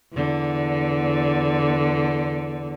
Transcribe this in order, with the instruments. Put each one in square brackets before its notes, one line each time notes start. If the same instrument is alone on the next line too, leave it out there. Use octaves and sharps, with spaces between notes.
[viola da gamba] E2 D3